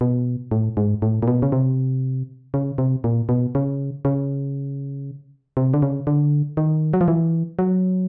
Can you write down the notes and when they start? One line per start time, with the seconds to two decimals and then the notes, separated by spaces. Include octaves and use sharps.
0.01 B2
0.51 A2
0.77 G#2
1.02 A2
1.22 A#2
1.28 B2
1.42 C#3
1.52 C3
2.54 C#3
2.78 C3
3.04 A#2
3.29 B2
3.55 C#3
4.05 C#3
5.57 C3
5.74 D3
5.82 C#3
6.07 D3
6.57 D#3
6.93 F#3
7.01 F3
7.08 E3
7.59 F#3